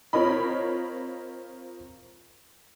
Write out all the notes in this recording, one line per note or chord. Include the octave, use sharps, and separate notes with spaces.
C4 F4 A#4 C#5 D#5 B5